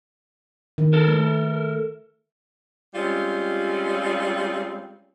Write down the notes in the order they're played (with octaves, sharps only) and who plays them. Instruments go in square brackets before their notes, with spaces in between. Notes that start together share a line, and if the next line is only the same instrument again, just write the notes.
[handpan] D#3
[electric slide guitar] A4 A#4
[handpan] A3
[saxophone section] G3 G#3 C4 C#4 F4